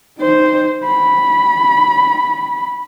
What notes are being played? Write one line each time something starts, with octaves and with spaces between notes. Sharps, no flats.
D#4 C5
B5